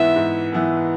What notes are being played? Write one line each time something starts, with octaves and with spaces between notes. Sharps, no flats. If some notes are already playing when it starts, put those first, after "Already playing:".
Already playing: G#2 E3 B3 E4 E5
G#2
E3 B3 E4